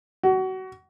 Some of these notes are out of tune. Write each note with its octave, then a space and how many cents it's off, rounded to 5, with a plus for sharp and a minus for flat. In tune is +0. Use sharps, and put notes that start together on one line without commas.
F#4 +25